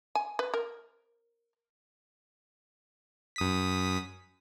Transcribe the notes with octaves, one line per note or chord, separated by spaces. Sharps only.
G#5
B4
A#4
F#2 D#6 B6